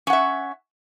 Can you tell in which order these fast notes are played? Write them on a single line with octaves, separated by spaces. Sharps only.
C#4 F#5 E5